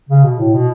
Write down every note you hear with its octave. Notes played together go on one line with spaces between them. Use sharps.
C#3
B2
A2
B2